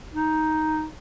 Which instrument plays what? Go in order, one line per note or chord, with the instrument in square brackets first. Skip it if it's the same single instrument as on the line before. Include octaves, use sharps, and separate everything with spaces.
[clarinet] D#4